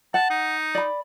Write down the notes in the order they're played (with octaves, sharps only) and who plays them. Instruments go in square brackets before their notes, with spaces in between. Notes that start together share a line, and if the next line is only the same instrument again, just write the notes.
[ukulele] F#5 [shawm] A5
[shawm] D#4
[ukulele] D5 B5